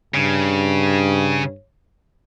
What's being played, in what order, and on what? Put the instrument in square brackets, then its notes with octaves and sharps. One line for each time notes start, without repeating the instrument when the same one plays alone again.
[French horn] G2 [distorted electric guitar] C#3